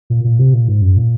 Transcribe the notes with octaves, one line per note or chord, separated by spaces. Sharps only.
A#2
A#2
C3
A#2
G#2
F#2
A#2